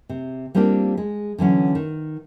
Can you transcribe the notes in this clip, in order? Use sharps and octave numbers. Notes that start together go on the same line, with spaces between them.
C3
G3 A#3 C4 D4 F4 G4
G#3
D3 E3 F#3 C#4
D#3